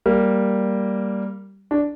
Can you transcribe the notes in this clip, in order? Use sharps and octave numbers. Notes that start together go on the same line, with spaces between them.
G3 A#3
D4